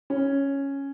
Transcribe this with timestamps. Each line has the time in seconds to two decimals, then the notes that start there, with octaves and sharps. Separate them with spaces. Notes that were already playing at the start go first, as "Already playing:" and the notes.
0.10 C#4